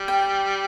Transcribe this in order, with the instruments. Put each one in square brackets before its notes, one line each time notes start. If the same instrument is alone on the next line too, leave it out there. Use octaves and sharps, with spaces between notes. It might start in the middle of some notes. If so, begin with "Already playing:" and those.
Already playing: [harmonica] G3
[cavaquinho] G5